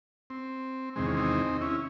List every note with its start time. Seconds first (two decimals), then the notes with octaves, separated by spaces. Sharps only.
0.30 C4
0.96 E2 C3 D#3 G#3 C4
1.06 C#4
1.17 C4 D#4
1.61 C#4 E4